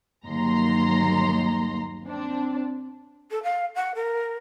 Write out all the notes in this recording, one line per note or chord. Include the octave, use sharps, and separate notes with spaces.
G1 D#2 F#3 A#5 C6
C4 D4
A4
F5
F#5
A#4